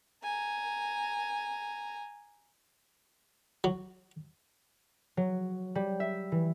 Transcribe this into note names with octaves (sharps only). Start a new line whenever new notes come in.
G#5 A#5
F#3
F#3
G3
E5
E3